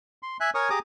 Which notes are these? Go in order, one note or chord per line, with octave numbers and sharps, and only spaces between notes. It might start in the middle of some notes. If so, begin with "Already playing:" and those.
C6
E5 G#5 F#6
A#4 C#5 G#5 C#6 D#6
G4 G#4 A#5 D6 D#6